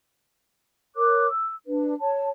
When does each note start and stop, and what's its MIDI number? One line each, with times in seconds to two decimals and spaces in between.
0.95 1.27 70
0.95 1.27 73
0.95 1.27 86
0.95 1.27 90
1.30 1.54 88
1.65 1.94 62
1.65 1.94 71
1.99 2.29 73
1.99 2.29 81